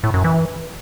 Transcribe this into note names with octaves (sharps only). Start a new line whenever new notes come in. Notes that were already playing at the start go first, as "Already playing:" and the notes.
A2
F#2
E3